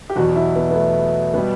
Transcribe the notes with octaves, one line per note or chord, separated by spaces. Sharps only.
G4
E2 B2 F#3 F#4
F#4
E4
B3
B3
A3
B2 G3 B3